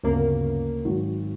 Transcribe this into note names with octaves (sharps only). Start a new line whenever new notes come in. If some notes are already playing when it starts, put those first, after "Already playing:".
G1 D2 C#3 A#3 A#4
G#1 F#3